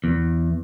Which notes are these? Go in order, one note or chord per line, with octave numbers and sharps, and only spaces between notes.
E2